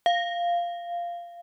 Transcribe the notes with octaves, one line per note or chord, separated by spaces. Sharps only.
F5